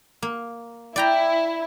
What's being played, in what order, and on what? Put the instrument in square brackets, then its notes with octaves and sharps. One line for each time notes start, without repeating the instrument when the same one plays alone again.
[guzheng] A#3
[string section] E4 [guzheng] D5 G5 A#5